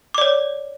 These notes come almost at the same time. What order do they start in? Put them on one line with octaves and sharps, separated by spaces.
D6 D5 C#5